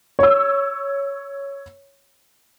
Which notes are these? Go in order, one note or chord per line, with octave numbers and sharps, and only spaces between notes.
C#5 E6